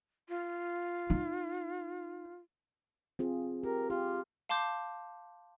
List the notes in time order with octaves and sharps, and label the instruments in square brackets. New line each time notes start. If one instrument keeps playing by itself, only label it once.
[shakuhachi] F4
[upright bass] D#4
[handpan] C4 F4 G#4
[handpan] G4 [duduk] A#4
[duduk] F4 [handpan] G4
[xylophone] F5 A5 C6 D6 G6